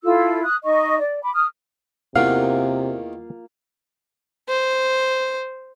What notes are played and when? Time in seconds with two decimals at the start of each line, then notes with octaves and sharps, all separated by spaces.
0.04 E4 F4 A4 E6
0.43 D#6 F#6
0.64 D#4 D#5 C#6
1.00 D5
1.22 B5 D6
1.34 D#6 F6
2.16 E2 C3 D#3 A#3 F4 F5 F#5
4.48 C5